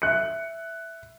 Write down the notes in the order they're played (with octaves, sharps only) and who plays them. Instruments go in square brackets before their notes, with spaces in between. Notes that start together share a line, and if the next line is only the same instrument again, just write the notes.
[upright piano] E5 F#6 C#7